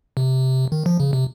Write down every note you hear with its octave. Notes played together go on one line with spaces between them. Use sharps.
C3
D#3
F3
C#3
C3